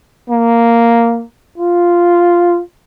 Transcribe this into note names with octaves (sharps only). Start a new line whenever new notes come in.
A#3
F4